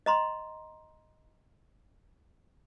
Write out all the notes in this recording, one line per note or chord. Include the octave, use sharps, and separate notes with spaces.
D#5 A#5 C6